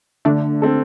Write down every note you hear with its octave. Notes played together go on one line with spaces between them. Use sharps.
D3 A3 D4
C4 A4